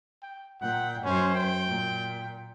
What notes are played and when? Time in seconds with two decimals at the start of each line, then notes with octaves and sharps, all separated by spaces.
0.23 G5
0.61 A#2 F#5 G5
1.04 F#2 C#4 C5
1.35 G5
1.67 A#2